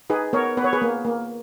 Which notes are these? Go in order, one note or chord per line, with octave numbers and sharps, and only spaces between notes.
D#4 G#4 B4
B3 A#4 C#5
B3 B4
C#5
G#4 B4
A#3
A#3